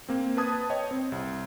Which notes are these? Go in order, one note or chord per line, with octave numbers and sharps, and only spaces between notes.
A#3 C4
B4 A5 D#6 G#6
C#5 D#5 G5
C4
C2